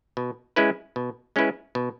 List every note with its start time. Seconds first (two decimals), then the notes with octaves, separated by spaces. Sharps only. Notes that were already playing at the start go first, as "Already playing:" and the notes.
0.17 B2
0.56 G#3 C#4 E4 B4
0.96 B2
1.36 G#3 C#4 E4 B4
1.75 B2